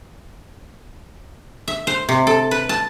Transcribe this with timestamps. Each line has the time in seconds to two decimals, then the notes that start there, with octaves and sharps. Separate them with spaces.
1.68 E5
1.87 C5
2.09 C3
2.27 A4
2.51 B4
2.69 A5